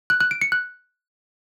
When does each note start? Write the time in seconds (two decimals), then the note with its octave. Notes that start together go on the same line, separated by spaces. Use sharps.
0.10 F#6
0.21 F#6
0.31 D7
0.41 C#7
0.52 F#6